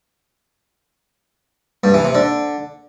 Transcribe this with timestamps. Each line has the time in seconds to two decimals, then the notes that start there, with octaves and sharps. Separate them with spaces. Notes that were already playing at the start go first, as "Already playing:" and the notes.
1.84 G2
1.94 E3
2.04 C3
2.15 D3